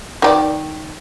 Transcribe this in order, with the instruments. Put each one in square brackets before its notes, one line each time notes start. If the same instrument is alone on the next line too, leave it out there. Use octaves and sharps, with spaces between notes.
[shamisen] D#3 G4 D5